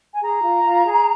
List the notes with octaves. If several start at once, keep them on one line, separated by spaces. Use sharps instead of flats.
G#5
G#4 A#5
F4
F4
G#4